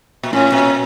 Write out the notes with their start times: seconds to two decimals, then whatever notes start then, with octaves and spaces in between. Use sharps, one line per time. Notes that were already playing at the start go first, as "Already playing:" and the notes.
0.23 A#2
0.33 A2 C#4
0.52 A#2